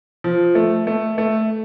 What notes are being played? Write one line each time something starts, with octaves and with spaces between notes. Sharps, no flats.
F3
A3
A3
A3